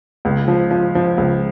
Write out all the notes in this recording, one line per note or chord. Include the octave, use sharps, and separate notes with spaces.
C#2
F3
F3
F3
C#2